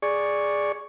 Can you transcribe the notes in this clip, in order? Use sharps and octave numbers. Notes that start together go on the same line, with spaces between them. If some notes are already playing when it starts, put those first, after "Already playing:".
G#4 D5 C#6